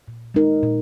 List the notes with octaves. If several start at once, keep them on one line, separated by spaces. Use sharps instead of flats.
A#2
G#3 D#4 A#4
A#2